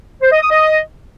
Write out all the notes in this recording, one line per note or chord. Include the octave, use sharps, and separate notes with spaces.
C5
D#5
D#6
D#5